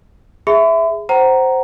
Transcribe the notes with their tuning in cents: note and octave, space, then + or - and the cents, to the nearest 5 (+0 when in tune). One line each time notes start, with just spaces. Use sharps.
G#4 +0 E5 +0 B5 +45
C5 +0 F#5 +30 A#5 +0